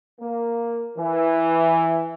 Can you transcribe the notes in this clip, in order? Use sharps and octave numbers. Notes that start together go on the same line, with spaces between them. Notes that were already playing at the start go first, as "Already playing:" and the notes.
A#3
E3